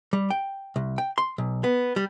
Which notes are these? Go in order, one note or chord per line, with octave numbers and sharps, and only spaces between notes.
G3
G5
C2
G5
C6
B1
B3
G3